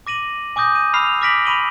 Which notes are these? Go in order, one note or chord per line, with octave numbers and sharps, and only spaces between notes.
D6 A#6 D#7 F#7
G#5 D6 D#6 G6 A#6
D#7
B5 E6 F6 C7 F7
D6 F6 A#6 B6 D7 F#7
B5 C#6 D#7 F#7 G7